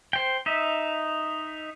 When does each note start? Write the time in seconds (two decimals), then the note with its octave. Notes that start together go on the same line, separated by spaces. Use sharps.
0.13 C5 G5
0.46 D#4 E5